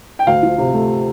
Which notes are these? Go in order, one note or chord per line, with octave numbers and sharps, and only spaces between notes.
G5
D2 F5
F3
C3
A3